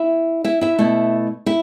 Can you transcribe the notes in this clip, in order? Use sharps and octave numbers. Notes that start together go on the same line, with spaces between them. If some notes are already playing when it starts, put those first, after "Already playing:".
Already playing: E4 E5
E4 E5
E4 E5
B2 A3 E4
E4 E5